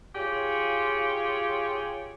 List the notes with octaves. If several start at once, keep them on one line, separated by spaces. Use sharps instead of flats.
F4 G4 G#4 C#5